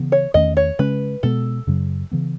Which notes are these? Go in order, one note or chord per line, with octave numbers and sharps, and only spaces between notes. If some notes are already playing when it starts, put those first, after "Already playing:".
Already playing: C#3 E3 B3
C#5
E2 D#3 A3 C#4 D#5
C#5
C#3 G#3 C#4 B4
B2 G#3 B3 A4
F#2 C#3 F#3
C#3 E3 B3